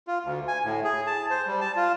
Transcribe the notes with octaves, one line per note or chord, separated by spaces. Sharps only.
F4
D2
G#5
A2
G#4
A5
C5
G3
A5
F4